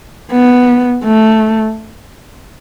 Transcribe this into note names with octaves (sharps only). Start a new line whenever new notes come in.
B3
A3